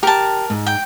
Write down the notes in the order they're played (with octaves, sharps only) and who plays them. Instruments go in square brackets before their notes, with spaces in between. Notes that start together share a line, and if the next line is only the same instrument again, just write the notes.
[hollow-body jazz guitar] G4 [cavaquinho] A#4 A5
[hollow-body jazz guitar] G#2
[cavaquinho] G5